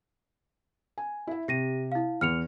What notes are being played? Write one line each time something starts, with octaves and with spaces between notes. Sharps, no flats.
G#5
E4 E5
C3 G4 A#6 D#7
E4 F5
E2 F6 C#7 F7